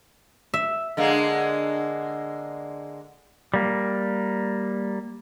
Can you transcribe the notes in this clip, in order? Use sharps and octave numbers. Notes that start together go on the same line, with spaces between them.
E5
D3 G#3 A#3
G3 A#3